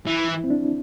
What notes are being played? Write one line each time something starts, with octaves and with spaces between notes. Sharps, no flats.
E3 E4
E4
C4
D4